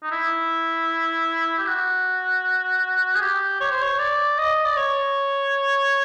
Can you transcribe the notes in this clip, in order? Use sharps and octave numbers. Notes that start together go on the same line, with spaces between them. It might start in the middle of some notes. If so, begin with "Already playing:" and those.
D#4
E4
G4
F#4
G#4
G4
C#5
C5
C#5
D5
D#5
D5
C#5